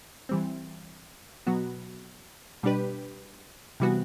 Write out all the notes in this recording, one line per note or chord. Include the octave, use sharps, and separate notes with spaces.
E3 G3 C4
B2 F#3 B3 F#4
B2 G3 D4 G4 B4
C3 E3 G3 B3 F#4